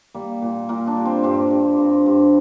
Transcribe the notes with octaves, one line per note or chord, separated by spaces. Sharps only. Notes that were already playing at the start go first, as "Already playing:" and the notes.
G3 A#3
A#2
A#2 A#3
D4
G3
C4
G2 C4
G2
G2
G2